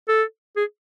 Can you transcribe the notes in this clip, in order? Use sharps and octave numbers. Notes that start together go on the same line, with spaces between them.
A4
G#4